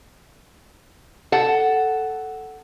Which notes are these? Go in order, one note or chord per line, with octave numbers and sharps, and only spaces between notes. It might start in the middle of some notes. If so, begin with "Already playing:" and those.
A4 F#5